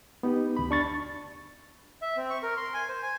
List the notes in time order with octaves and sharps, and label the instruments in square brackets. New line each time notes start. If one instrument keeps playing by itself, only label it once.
[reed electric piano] B3 D#4 G4
D2 B5
[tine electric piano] D4 C#6 A6
[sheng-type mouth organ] E5
C4
C#6
A#4
C6
G#5
C5
G#5